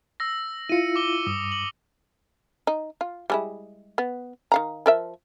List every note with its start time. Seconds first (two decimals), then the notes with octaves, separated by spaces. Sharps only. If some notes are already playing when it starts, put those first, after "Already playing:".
0.20 E6 A#6
0.69 E4 F4 C#7 D#7
0.96 D6 G7
1.27 G2 D#6
1.52 F#7
2.67 D#4
3.01 F4
3.30 G3 G#3 E4
3.98 B3
4.52 D#3 F5 A#5
4.86 F3 A#4 E5